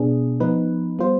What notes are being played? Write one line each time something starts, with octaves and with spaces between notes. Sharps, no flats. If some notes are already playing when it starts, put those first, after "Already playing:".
Already playing: B2 B3 D4 G#4
F3 B3 D#4 B4
G3 B3 F4 C5